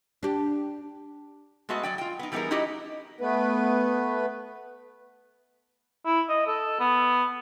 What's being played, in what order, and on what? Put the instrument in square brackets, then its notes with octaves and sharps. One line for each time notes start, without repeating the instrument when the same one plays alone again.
[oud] D4 G4
[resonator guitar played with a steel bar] G#3 A3 B3 F#4 D#5
F#3 D5 G5
F4 G5
B3 D#4
E3 G3 B3 D#4 G#4 A#4
D#4 E4 F#4 G4 D#5
[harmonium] A3 B3 B4
[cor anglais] E4
D#5
A4
B3